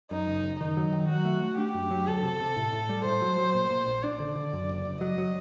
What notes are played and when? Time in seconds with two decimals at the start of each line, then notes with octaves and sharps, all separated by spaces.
0.11 F#2 D#4
0.28 F#1
0.43 F#1
0.60 D#3 D#4
0.77 F#3
0.92 D#3
1.09 F#3 F#4
1.25 A3
1.42 A3
1.58 D4 G4
1.74 F#2
1.91 F#3
2.07 D2 A4
2.23 C3
2.40 C3
2.56 A2
2.73 A2
2.89 G3
3.05 A2 C5
3.22 F#3
3.38 F#3
3.55 A#2
3.70 A#2
3.87 A#1
4.03 D4 D5
4.20 D3
4.36 D3
4.53 F#2
4.69 F#1
4.85 F#1
5.01 F#3 D#5
5.18 F#3